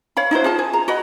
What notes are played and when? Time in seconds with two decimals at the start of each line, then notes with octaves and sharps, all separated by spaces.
0.17 C#5 F5 B5
0.31 D#4 E4 F#4 C5
0.44 F4 G#4 A5
0.59 G#4
0.73 A#5
0.88 F#4 D#5 B5